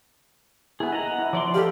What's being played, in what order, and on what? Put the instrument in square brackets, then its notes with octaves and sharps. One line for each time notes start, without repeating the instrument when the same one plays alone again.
[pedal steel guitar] B3 G#4 [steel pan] E4
[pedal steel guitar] D#5 F#5 A#5
[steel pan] E4
[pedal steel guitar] F3 D5 C6 [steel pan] D6
[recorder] G4 [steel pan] A4 F5